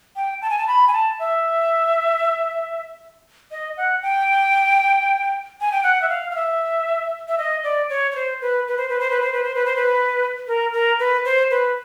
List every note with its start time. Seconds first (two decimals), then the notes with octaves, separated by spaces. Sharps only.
0.16 G5
0.42 A5
0.50 G#5
0.58 A5
0.67 B5
0.88 G#5
0.93 A5
1.19 E5
3.51 D#5
3.77 F#5
4.02 G5
5.61 G#5
5.72 G5
5.83 F#5
6.02 E5
6.09 F5
6.31 F5
6.35 E5
7.28 E5
7.38 D#5
7.64 D5
7.89 C#5
8.11 C#5
8.15 C5
8.41 B4
8.68 B4
8.77 C5
8.89 B4
9.00 C5
9.10 B4
9.22 C5
9.33 B4
9.43 C5
9.55 B4
9.66 C5
9.76 B4
10.47 A#4
10.73 A#4
10.99 B4
11.25 C5
11.50 B4